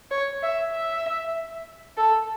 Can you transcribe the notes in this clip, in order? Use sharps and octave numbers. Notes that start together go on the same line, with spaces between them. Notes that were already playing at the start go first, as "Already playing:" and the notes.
C#5
E5
E5
A4